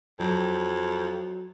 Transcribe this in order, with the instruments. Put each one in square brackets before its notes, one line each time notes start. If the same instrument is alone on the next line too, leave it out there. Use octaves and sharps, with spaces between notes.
[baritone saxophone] F2 [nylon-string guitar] F#3